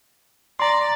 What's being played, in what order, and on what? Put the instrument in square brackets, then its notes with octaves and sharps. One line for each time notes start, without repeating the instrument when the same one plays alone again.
[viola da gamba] D5 [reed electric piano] A#5 C6